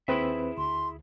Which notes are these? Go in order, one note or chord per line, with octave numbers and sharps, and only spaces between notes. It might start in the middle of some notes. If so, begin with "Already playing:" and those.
D#2 C4 E4 G#4 B4 E5
D2 C6